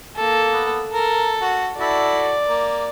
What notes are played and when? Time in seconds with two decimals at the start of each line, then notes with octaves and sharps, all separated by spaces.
0.16 A#3 A4
0.52 B3
0.93 A4 A#4
1.42 F#4
1.79 E4 F#4 A4 D5
2.47 A#3